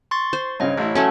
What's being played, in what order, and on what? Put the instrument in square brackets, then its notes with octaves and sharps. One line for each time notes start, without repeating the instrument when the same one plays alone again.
[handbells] C6 C#6 A6
[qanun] C5
[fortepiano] G2 C#3 [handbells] C#5 D#5
[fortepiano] A1 E4
[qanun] F#3 A3 C#4